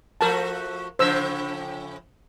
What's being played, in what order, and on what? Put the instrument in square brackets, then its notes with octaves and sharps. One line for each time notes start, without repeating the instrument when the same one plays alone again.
[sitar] F3 A3 F#4 [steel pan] A#4 A5
[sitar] A2 C#3 F3 [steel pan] C5 E6